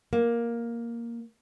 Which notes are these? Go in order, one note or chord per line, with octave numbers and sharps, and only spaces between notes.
A#3